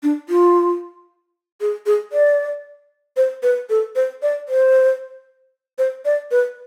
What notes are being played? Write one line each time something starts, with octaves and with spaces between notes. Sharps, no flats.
D4
F4
G#4
G#4
D5
C5
B4
A4
C5
D5
C5
C5
D5
B4